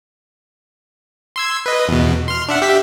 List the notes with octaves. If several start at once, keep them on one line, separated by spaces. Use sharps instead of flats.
C6 E6 G#6
B4 D#5
E2 B2
C6 F6
D4 E5 F#5
G4 E5 B6